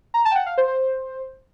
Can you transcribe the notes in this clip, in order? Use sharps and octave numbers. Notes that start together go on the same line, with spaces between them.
A#5
A5
G5
F#5
F5
C5
C5